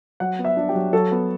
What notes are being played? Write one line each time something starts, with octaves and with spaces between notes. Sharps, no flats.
F#3 F#5
B3
E5
D4
G4
F#3
F#3 A4
B3